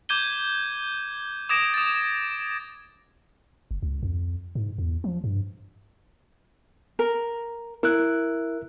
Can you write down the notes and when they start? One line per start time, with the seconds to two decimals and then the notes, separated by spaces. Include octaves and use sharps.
0.09 D6 G6 G#6 D#7 G7
1.49 D6 D#6 G#6 A#6 D7 E7
1.74 D#6 A6
3.71 F#1
3.83 C#2
4.03 F2
4.55 G#2
4.78 E2
5.04 F3
5.24 G2
6.99 A#4
7.83 E4 A#4 F#6